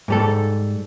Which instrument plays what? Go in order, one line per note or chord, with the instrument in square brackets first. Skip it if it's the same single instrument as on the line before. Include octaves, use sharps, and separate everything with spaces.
[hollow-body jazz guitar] G#2 G3 A4